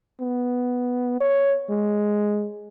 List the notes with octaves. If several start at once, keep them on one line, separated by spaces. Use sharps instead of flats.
B3
C#5
G#3